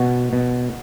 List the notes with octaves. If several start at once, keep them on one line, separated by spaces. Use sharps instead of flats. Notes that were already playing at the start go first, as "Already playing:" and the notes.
Already playing: B2 F#4
B2